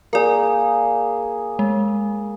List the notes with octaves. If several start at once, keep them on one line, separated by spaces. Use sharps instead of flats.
A#3 G#4 A#4 D5
G#3